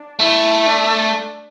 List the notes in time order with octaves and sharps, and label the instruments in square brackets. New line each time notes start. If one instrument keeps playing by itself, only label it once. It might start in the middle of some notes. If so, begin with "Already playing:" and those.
Already playing: [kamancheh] D4
[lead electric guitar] A3 [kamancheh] E4
[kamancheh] D4